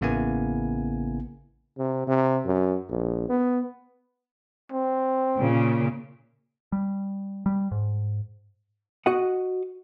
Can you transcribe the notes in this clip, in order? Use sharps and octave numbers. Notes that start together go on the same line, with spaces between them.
A1 C#3 A#3 B3 E4 G#5
C3
C3
F#2
A#1
B3
C4
A#2 C#3
G3
G3
G#2
F#4 D#5 F#5